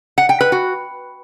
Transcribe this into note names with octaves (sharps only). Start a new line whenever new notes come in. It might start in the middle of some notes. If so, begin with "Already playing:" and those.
F#5
G5
B4
F#4